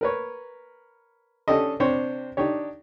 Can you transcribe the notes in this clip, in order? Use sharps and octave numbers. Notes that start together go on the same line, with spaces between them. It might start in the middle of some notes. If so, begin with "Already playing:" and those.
A#4 B4 C#5
C#4 D4 G4 A4 D#5
C3 D4 G4 C5 C#5
D4 D#4 G4 C#5